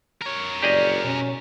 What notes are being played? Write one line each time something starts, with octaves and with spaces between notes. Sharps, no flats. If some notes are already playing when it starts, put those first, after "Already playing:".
A#4 C#5
F#1 G4 G#4 D5 D#5
B2 C#4